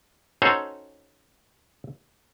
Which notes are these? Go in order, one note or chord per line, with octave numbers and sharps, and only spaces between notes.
C#4 D#4 F#4 A4 C5 C#5